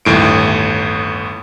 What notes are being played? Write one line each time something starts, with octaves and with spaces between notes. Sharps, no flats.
G1 D#2 A2 D7